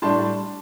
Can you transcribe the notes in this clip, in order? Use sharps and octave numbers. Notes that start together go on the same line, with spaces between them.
A2 G3 D4 A5 C6